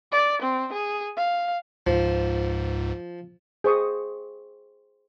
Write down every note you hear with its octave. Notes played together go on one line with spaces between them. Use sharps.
D5
C4
G#4
F5
C#2 G#2 F3
G#4 C5 C#6 D#6